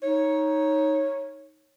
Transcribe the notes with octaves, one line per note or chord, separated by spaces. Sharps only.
D#4 C#5